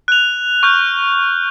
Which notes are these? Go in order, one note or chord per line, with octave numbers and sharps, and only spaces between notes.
F#6 F7
C#6 F6 G6